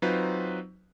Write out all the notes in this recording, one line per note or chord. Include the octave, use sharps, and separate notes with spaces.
F#3 C4 D#4 F4 B4 C5